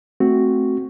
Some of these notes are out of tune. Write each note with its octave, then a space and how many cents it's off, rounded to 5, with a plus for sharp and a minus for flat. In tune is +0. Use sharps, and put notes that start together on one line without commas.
A3 +0 C4 +0 F#4 +0